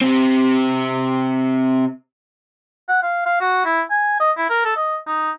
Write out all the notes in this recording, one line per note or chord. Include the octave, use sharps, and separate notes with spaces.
C3 C4
F#5
F5
F5
F#4
E4
G#5
D#5
E4
A#4
A4
D#5
D#4